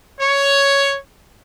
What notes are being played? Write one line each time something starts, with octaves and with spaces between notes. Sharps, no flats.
C#5